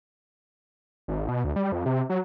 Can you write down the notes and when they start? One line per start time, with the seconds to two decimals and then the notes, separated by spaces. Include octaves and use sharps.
1.08 G#1
1.28 B2
1.44 D2
1.56 G3
1.72 F2
1.86 C3
2.10 F#3